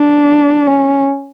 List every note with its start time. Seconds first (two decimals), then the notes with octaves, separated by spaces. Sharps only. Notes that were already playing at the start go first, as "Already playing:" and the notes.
Already playing: D4
0.67 C#4